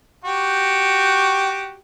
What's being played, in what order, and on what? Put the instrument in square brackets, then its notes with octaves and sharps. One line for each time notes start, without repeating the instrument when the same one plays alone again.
[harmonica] F#4 G4